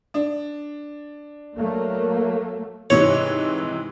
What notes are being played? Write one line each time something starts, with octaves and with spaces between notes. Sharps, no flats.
D4
F#3 A3 A#3
G#2 C3 E3 C#5